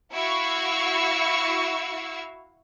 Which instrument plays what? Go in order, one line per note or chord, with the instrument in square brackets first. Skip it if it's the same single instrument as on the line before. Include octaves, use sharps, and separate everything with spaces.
[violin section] E4 F#4 F5 C#6 E6